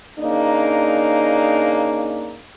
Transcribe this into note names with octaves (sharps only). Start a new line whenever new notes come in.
C#3 A#3 D4 D#4